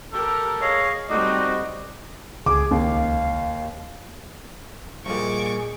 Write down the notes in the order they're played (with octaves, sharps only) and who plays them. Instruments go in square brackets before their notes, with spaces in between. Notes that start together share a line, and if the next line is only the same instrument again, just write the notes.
[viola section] G4 A#4 [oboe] A4
[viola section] G#4 [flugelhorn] C#5 [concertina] D#5 F5
[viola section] G3 A3 C4 [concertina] D#4 F#4 [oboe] D5 [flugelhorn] D#5
[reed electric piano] C#2 [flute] G#4 [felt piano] D6
[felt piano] D#2 [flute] F5
[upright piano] A#1 A#2 [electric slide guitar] G3 A#3 D#5 [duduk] G#4 [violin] C#6 D6